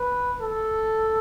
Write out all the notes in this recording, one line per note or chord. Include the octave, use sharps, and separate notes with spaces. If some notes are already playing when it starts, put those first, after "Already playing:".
Already playing: B4
A4